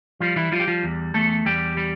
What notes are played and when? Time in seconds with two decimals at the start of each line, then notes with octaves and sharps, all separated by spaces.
0.20 F3 G3 F4
0.36 E3 E4
0.52 F3 G3 F4
0.60 G4
0.67 F3 F4
0.83 E2
1.14 E2 A3 A4
1.45 E2 G3 G4
1.77 G3